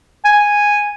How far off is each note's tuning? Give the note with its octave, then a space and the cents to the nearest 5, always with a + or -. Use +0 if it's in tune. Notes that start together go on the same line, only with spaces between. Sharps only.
G#5 -5